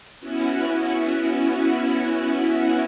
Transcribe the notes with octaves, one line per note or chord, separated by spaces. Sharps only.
B3 C#4 E4 F#4